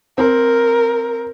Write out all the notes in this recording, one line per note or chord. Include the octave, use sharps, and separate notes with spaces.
C4 A#4